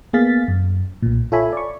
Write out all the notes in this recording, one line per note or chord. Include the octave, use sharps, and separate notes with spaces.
A#3 B3 G#4 F5 A6 B6
F#2
B1 A#2
F4 A4 C#5 E5 G#5 B5
D5 C#6